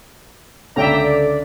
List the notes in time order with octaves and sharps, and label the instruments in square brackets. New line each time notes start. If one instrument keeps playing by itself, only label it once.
[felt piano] C#2 D3 C#4 [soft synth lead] A4 [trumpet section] D5 [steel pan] E5 G5 A#5